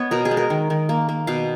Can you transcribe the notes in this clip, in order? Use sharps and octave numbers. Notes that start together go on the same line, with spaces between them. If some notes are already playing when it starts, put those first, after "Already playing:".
Already playing: B3 C#5 D#5
B2 A#4
G#4
G#3
A#4
D#3
D#3
A#3
A#3
B2 F5